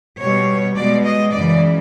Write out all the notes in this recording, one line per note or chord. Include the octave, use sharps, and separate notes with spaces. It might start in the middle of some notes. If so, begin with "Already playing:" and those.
B2 G3 C#5
B2 G#3 D5
D#5
F#2 C#3 E3 D5